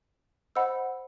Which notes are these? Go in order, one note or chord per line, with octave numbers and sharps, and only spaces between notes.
C5 D#5 F#5 B5 E6